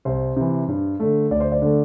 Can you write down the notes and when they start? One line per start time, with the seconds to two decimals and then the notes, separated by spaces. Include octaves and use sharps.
0.05 C2 C5
0.36 C3 E3
0.68 G2
1.00 D3 A3
1.30 D2 D5
1.40 C5
1.52 D5
1.62 D3 A3